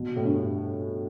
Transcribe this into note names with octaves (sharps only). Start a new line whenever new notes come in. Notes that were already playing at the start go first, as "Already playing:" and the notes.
Already playing: B2
A2
G2